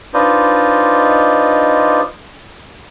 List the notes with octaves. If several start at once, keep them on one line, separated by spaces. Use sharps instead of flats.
D4 D#4 F4 B4 C5 D#5